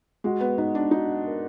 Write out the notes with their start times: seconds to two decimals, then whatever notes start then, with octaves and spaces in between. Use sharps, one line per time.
0.24 G#3 F#4
0.40 B3
0.58 B3 D#4
0.75 D4
0.91 D#4 F#4
1.26 A#4